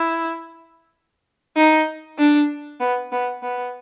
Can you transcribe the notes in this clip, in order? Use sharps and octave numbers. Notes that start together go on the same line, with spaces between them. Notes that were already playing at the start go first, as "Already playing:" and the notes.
Already playing: E4
D#4
D4
B3
B3
B3